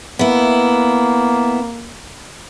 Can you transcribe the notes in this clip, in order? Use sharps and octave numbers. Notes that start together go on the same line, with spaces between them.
A#3 B3 E4